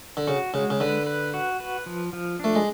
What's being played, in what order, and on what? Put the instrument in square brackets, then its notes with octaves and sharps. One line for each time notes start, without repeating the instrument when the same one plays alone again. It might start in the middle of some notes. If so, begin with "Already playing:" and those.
[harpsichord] D3
[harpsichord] C#3 [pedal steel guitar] F#4
[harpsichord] C#3 [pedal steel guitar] G#3
[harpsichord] C#3
[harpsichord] D3 [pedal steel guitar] B4
[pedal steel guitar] B4
F#4
B4
F3
F3
[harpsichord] A3 [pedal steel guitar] D4
[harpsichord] G#3